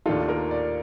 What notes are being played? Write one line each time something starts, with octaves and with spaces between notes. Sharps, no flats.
D#2 D#3 A3 D4 F4 A4
A#4
D5